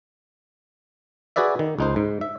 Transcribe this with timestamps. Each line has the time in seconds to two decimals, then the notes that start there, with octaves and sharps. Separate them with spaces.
1.36 F#4 G#4 B4 D5 E5
1.59 D#3
1.79 C#2 D#4 C5
1.96 G#2
2.21 E5